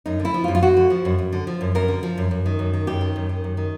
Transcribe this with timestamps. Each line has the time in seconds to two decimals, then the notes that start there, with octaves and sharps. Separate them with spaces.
0.06 F#2 D#4
0.20 D3
0.25 E4
0.34 F3
0.44 F4
0.48 F#2
0.55 F4
0.63 F#2 F#4
0.77 D3
0.90 F3
1.05 F#2
1.18 F#2
1.33 D3
1.47 F3
1.61 F#2
1.75 F#2 A#4
1.88 D3
2.03 F3
2.18 F#2
2.31 F#2
2.46 D#3
2.59 F#2
2.74 D#3
2.87 F#2 G4
3.01 D#3
3.16 F#2
3.29 D#3
3.44 F#2
3.57 D#3